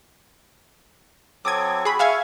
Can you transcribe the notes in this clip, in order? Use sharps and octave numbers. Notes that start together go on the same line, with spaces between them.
F#3 C4 A4 D6 D#6 G#6
F#4 G#4 B5
E5 F5 G#5 C#6 G#6